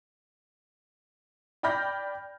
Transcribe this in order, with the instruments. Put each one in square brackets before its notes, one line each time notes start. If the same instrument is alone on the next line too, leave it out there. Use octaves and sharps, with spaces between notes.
[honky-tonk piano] D5 G5 B5 F6 G6 A#6